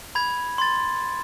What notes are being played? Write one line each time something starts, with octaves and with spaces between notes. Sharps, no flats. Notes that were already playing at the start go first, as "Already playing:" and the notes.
B5 G#6
C6 A6